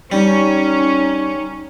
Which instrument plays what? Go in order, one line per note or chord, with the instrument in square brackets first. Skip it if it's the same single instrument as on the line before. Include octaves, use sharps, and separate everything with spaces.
[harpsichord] G3 [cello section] C#4 [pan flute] D#4